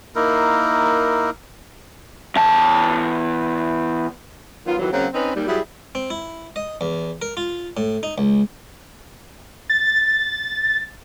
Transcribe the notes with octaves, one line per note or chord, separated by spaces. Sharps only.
A#3 D#4 E4 A#4
E2 A5
D#3 F#3 B3 F4
F2 D#3 E3 F#3
C#3 F#3 A#3 C4 C#4
C4 C#4 D#4 B4
D#2 G3
F#3 G3 E4 G#4
C4
E4
D#5
E2
A#4
F4
A2
D#4
C#2
A6